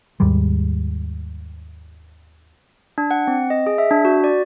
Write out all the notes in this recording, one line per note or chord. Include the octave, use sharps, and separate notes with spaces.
D#2 G#2 G3 G#3
D4
F#5
C4
D#5
G#4
E5
D4
F#4
D5